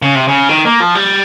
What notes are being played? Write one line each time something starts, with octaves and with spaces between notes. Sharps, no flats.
C#3
C3
C#3
D#3
A#3
F3
G3